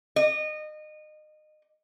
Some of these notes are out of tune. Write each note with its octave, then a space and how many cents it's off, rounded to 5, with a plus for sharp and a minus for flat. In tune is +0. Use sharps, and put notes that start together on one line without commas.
D#5 -25